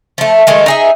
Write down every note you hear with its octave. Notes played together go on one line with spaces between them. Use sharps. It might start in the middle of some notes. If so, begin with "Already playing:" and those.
F3 A3
D#3 G#3 A3 F4
D#4 G#4 E5